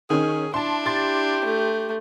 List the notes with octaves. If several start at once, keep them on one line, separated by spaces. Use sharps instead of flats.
D#3 C#4 G#4
D4 E4 A5 C6
G4 C6 A6
A3